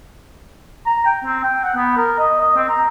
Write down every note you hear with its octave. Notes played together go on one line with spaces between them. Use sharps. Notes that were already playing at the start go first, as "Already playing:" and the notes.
A#5
G5
C4
G5
F#5
B3
A#4
D#5
D#5
C4
A#5